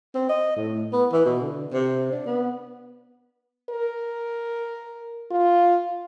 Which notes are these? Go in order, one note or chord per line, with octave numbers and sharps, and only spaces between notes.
C4
D#5
A2
B3
E3
B2
D3
C3
D4
B3
A#4
F4